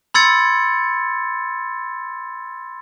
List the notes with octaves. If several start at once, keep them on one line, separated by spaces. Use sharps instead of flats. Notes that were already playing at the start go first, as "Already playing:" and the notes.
B5 C6 E6 G#6 A6 C#7